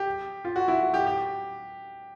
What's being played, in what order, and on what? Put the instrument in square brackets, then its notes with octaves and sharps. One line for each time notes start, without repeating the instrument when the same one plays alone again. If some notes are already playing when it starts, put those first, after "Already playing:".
Already playing: [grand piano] G4
F4
F#4
E4
F#4
G4
G4